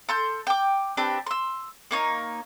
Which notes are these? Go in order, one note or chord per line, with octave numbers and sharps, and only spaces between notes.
A4 C6 G6
G5 D6
C4 D4 G4 B4
C6 E6
A#3 D#4 C#5